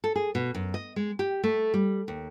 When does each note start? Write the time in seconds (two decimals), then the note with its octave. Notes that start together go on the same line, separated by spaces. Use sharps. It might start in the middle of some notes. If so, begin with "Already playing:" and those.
0.04 A4
0.16 G#4
0.35 B2
0.55 F#2
0.74 D#5
0.96 G#3
1.19 G4
1.44 A3
1.74 G3
2.08 D#2